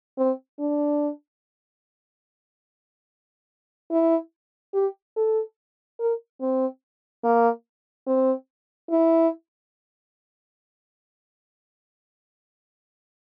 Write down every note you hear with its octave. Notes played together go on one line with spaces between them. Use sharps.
C4
D4
E4
G4
A4
A#4
C4
A#3
C4
E4